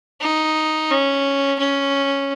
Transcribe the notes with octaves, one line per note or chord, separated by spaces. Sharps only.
D#4
C#4
C#4